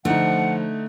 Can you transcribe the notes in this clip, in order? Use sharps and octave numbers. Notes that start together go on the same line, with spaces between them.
D3 F3 A3 D#4 F#5